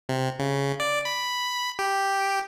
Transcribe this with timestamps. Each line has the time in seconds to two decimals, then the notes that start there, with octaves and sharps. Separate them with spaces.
0.09 C3
0.39 C#3
0.80 D5
1.05 B5
1.79 G4